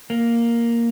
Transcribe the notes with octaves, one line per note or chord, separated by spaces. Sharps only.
A#3